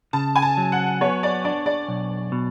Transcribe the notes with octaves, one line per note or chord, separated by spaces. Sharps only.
C#3 A5
G#5
A5
F#3
F#5
B3 C#5
D5
D4 D5
D5
B1
B2